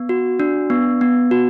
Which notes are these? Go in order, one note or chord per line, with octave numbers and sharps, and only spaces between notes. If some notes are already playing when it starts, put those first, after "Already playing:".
Already playing: B3
F#4
D4
B3
B3
F#4